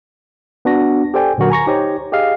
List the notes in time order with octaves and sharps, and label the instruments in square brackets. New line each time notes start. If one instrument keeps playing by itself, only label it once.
[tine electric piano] B3 D4 F#4 A#6
G4 A4 C5 D5 G5 G#5
A#2 D3 F#3 F#4 A#4
G#5 A#5 C#6 A#6
D#4 G4 C5 C#5
G4 G#4 D#5 F5